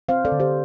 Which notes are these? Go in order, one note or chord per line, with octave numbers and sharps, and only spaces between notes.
C4 C5 F5
A4 D5
D3
G4 C5